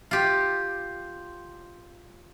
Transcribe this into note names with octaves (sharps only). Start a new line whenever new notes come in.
F4 G4